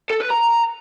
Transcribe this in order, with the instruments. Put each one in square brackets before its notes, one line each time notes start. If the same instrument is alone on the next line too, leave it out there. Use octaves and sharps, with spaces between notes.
[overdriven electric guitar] A4
B4
A#5